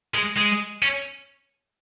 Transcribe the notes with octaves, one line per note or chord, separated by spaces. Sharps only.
G#3
G#3
C#4